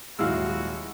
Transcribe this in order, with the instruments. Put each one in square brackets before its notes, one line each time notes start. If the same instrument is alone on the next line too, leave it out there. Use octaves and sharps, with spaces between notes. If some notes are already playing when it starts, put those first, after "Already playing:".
[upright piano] D#1 F#3 E6 [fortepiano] G#3 E4 F5 [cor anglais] F#4